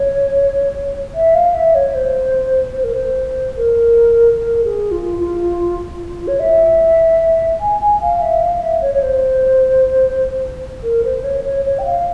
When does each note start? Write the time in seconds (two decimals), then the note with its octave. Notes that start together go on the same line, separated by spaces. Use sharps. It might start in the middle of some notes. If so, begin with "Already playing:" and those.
Already playing: C#5
1.15 E5
1.35 F5
1.54 E5
1.75 C#5
1.95 C5
2.76 C5
2.84 A#4
2.93 C5
3.57 A#4
4.37 A#4
4.64 G#4
4.91 F4
5.19 F4
5.99 F4
6.28 C#5
6.40 E5
7.60 G#5
7.81 G#5
8.01 F5
8.22 E5
8.42 F5
8.62 E5
8.82 C#5
8.94 C#5
9.02 C5
10.83 A#4
11.05 C5
11.24 C#5
11.45 C#5
11.65 C#5
11.79 G5
11.85 F5